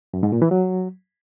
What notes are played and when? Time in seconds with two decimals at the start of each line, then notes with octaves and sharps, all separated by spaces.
0.14 F#2
0.23 G#2
0.32 A#2
0.42 E3
0.51 F#3